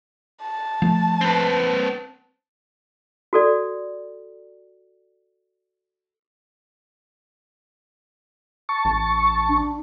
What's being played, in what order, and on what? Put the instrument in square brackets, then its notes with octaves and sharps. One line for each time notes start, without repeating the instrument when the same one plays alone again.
[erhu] A5
[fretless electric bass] F3 A3
[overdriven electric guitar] C4 B4
[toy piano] F#4 A4 D5
[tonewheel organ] A5 C#6
[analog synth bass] A1
[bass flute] D4